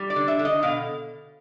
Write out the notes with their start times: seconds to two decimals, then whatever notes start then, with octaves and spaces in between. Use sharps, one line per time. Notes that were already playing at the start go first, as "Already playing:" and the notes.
Already playing: G3
0.10 D5
0.16 D3
0.28 E5
0.39 D3
0.45 D#5
0.62 B2 F5